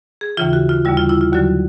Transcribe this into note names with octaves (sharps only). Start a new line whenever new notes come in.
G#4
D#2 C#3 E3 F4
F#4
F4
D#2 D3 G3 E4
F4
E4
F4
D#2 D3 F#3 F#4